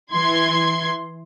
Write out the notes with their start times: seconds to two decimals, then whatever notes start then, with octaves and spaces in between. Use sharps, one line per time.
0.13 E3 C6 G#6